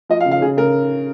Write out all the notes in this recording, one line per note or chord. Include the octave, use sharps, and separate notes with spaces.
F3 D#5
F5
C#3
F5
C#3 G#4
C#3 A#4